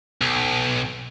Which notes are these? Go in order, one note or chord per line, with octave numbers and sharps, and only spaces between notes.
B1